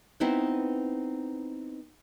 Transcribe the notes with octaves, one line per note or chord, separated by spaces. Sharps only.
B3 C4 D#4 E4 B4 C5